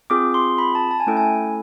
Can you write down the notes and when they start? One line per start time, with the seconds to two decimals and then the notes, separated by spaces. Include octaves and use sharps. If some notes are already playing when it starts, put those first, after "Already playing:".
0.10 C4 F4 G#4 D6
0.34 C6
0.58 B5
0.75 A5
0.91 A5
1.00 G#5
1.07 A3 C#4 E4 A4 G5
1.17 G#5